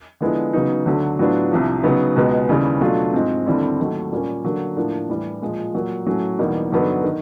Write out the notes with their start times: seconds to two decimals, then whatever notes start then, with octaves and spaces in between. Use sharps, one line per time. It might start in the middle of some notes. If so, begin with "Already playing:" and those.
0.21 D3 F3 G#3 B3 E4
0.53 C#3 F#3 B3 D#4
0.86 D2 D3 F#3
1.19 A2 F#3 B3 D4 F4
1.51 C2 C3 F3
1.83 C#3 F#3 B3 D#4
2.16 C#2 B2 G#3 B3
2.49 D#2 C#3 E3 G3
2.81 B2 F#3 A3 D4 F4
3.13 G#2 F3 G#3 C4
3.46 D#2 D3 G3 C4 E4
3.79 D#2 D#3 F#3 A3
4.12 A#2 G3 A#3 C#4
4.45 D3 F#3 A#3
4.76 A2 F3 A#3 D4
5.09 A2 E3 G3
5.42 A#2 F3 G#3
5.74 A#2 F#3 A#3
6.06 A2 F#3 A3 C#4
6.39 E2 B2 G3 A#3 D#4
6.72 G2 D3 F#3 B3 D#4
7.04 D#3